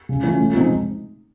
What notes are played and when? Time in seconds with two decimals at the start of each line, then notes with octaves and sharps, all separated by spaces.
0.09 C#3
0.23 E3 A3 C#4 F4
0.38 A2
0.53 F3 G#3 C4 D#4